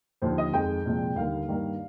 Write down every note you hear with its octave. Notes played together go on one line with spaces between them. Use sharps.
D#2 D3 F3 C5
D#5
F2 D#3 G#3 G5
C2 A#2 F3 G#3
D#2 D3 G3 A#3 F5
G2 D#3 G3 A#3